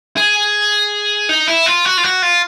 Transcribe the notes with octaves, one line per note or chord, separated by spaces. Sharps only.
G#4
D#4
E4
F4
F#4
F4
F#4
F4